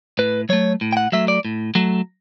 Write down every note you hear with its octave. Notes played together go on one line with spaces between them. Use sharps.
A2 B4
F#3 A3 C#5
A2
G5
F#5
F#3 A3 E5
D5
A2
F#3 A3